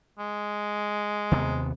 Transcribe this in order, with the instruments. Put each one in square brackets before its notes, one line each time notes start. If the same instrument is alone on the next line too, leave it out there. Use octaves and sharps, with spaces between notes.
[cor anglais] G#3
[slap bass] D#2 C3 B3